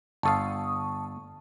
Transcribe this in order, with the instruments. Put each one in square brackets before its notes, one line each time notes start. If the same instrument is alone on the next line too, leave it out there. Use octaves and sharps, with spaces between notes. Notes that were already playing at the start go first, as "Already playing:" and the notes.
[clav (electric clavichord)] G1 A4 F5 [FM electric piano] A5 C#6 D#6